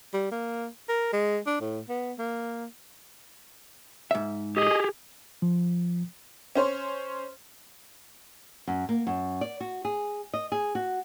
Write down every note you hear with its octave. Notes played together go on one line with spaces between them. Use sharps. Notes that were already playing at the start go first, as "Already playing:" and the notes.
G3
A#3
A#4
G#3
D4
A2
B3
A#3
G#2 E5
G4 G#4 D#5
F3
C#4 C5 C#5 C6
F#2
A#3
F#2
D5
F#4
G#4
D#5
G#4
F#4